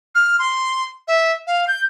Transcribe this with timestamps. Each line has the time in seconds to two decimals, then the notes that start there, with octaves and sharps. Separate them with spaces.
0.15 F6
0.39 C6
1.08 E5
1.47 F5
1.68 G6